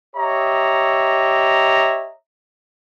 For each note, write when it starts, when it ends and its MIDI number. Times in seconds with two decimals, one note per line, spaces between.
0.16 2.11 67
0.16 2.11 73
0.16 2.11 75
0.16 2.11 76
0.16 2.11 82